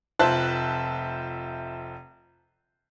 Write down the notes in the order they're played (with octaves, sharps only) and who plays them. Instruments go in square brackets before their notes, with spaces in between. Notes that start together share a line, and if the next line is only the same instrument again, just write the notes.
[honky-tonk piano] F1 F4 C5 E5 A5 F#6